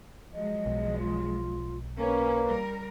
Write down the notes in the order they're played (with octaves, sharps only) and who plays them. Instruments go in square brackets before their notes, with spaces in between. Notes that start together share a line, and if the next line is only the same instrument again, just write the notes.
[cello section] F3 F#3 G#3 [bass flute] D#5
[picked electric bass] B1
[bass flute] F4
[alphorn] A#3 [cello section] C#4 [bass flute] B4
[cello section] G3 A#4